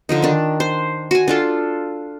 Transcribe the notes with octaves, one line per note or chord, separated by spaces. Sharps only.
D3 F3 D#4
D#3 D4
C5
F#4 G#5
D4 F4 A4